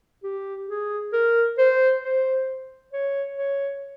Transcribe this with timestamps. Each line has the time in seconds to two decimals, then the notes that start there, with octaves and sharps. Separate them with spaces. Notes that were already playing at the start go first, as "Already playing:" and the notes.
0.24 G4
0.68 G#4
1.13 A#4
1.58 C5
2.03 C5
2.93 C#5
3.37 C#5